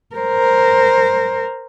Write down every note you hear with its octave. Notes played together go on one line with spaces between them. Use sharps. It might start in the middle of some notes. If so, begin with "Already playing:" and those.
A#4 C5